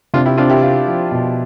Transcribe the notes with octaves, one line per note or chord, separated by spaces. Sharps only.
C3 D4 F4
E4 G4
C4 D4 F4
E4 G4
F4
F3
B2